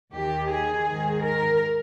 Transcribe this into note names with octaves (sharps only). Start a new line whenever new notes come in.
D#2 D#3 G4
G#4
G#2 D#3
A#4